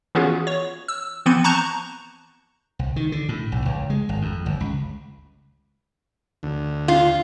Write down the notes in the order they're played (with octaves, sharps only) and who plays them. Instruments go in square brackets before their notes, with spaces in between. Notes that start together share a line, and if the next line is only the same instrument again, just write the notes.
[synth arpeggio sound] E3 B3 C#4 F4 F#4 G#4
C#5
E6
E3 F3 B3 C4 C#7 D#7
A5 A#5 C#6 F#6 G6
[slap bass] C2
D#3
D3
A2
B1
C#2
G#3
G#1
F2
G1
C#2
[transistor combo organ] D2
[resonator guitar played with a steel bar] F4